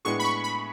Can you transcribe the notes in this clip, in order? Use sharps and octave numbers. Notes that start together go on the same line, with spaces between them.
A2 G#3 B3 D4 G#4 C#6
B5
C#6
B5